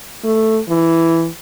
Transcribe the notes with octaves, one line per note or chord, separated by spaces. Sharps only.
A3
E3